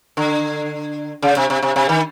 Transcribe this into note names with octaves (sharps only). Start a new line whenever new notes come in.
D3
C#3
C3
C3
C3
C3
D#3